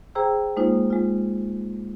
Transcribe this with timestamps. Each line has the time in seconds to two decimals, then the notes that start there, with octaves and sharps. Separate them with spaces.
0.15 G#4 C5 G5 A#5 E6
0.57 G#3 A#3 D#4 F4 C5
0.90 G#3 F4